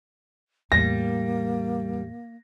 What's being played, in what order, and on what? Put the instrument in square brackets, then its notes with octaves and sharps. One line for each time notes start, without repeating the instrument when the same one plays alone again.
[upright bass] E2 A2 [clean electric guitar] G3 [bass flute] A#3 [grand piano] A#6